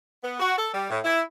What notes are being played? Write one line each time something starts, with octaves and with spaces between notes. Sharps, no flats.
B3
F#4
A4
G3
A2
E4